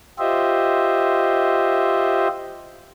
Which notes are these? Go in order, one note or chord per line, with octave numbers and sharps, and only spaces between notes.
F4 G4 C5 D#5 E5